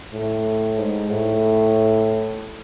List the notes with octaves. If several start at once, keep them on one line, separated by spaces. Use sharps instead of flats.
A2
G#2
A2